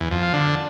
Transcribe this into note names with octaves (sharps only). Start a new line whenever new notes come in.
E2
F2
F3
D3